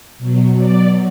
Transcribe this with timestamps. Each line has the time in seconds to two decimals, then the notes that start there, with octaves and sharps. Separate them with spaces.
0.18 B2 F#3
0.59 D5